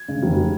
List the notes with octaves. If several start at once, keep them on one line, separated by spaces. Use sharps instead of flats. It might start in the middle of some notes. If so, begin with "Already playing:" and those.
Already playing: G#6
C#3
F1